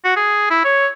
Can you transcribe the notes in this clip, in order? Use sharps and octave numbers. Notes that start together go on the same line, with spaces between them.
F#4
G#4
E4
C#5